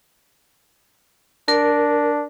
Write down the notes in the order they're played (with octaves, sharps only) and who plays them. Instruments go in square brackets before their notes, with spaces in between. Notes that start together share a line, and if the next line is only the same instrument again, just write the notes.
[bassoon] D4 [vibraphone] A#4